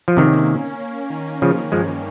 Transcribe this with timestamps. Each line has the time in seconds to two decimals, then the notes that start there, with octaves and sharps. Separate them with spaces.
0.08 F3
0.17 C3 D#3 C#4
0.33 A#3
0.48 A#3
0.64 C#4
0.80 A#3
0.94 C#4
1.10 D#3
1.27 C#4
1.41 C#3 F3 C#4
1.57 D#3
1.72 G2 F3 G#3
1.88 C#4